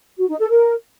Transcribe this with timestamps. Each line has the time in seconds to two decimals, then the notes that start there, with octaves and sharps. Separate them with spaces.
0.18 F#4
0.29 D#4
0.39 A4
0.50 A#4